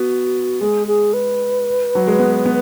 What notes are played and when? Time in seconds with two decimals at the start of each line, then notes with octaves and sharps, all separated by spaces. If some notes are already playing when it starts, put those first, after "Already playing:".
Already playing: B3 F#4
0.61 G#3 G#4
0.87 G#4
1.13 B4
1.95 F#3
2.07 G#3
2.19 B3
2.46 B3